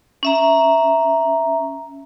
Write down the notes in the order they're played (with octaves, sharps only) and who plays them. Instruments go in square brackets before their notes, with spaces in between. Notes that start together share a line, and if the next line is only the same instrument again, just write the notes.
[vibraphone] C#4 E5 A#5